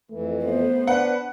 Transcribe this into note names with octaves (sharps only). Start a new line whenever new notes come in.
F2 E3 A3
B3 C5
D4 B4 F#5